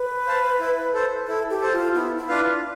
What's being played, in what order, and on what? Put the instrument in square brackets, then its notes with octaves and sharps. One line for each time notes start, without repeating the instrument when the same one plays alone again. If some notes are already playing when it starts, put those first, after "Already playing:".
Already playing: [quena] B4
[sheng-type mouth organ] C5 F5 A5
E4
A4 C5
[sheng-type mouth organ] E4 [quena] A4
[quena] G4
[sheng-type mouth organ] A4 C5
[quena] F4
[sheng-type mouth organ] B3 [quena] E4
[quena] E4
[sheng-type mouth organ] D4 F4 B4 F5